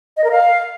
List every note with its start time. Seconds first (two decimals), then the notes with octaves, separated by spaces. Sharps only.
0.17 D#5
0.24 A#4
0.31 F5